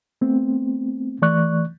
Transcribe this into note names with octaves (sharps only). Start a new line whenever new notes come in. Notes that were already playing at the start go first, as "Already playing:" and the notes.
A3 B3 C4
E3 A3 D5 C#6 F#6